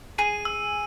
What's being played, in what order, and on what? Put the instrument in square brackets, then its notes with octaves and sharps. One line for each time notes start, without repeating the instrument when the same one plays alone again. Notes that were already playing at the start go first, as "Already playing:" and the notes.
[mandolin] G#4 [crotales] D#7
[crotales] E6